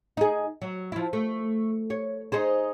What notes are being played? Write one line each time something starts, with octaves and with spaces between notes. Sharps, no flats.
D#4 G#4
F#3
F3 E4
A3
C#5
D#4 G#4 C5